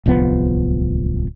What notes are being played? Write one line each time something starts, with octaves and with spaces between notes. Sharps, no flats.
D1 C2 F3 B3